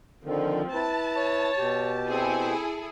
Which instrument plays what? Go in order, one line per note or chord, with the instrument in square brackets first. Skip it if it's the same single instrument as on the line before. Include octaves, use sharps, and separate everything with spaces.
[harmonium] D3 D#3 [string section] F3 [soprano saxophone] C4
[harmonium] E4 B4 [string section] A5
[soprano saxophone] C#5
[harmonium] B2 G4
[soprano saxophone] C4 [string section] E4 G#4 A4